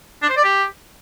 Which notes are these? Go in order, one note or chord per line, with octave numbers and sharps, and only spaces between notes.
D4
C5
D5
G4